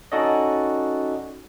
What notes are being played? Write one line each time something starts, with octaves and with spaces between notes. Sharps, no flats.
C#4 D#4 F#4 A4 D5 D#5